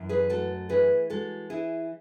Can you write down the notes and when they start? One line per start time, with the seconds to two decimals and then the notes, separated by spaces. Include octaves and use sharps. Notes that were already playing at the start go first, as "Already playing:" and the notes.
Already playing: F#2 E3
0.09 G#4 B4
0.30 A3 F#4 A4
0.69 E3 G#4 B4
1.10 G#3 F#4 A4
1.50 E3 E4 G#4